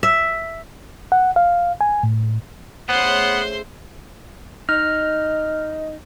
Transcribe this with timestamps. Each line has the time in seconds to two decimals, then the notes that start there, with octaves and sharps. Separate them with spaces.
0.03 E5
1.12 F#5
1.36 F5
1.81 G#5
2.03 A2
2.89 A2 C#3 B3 C5 F#5 C6
4.69 D#4 D#5 F6